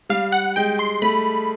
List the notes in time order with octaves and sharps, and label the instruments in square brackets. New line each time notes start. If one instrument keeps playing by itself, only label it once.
[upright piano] G3 [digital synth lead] F5
[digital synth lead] F#5
[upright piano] G#3 [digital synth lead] G5
[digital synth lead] C6
[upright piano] A3 [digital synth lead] B5